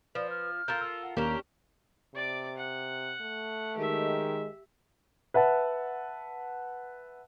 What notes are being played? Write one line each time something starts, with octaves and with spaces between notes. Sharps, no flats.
F3 B4 D5
F6
F4 A4 A#4 A#5 G6
E6
F#5
D#2 A#3 C#4 D4 G4 A#4 A#5
C3 D5 D6
F#5
A3
D#3 G#3 G4 E5
B4 E5 F#5 A5